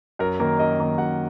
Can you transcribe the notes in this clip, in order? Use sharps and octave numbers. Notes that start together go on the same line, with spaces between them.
F#2 A#4
D#3 A#3 A#4
F#2 D#5
D#3 A#3
F#2 F#5